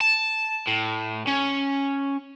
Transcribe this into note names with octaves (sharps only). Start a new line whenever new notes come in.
A5
A2
C#4